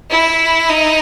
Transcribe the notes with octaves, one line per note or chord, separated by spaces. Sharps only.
E4
D#4